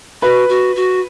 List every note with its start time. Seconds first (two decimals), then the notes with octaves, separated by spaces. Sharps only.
0.22 F#4 B4
0.49 F#4
0.76 F#4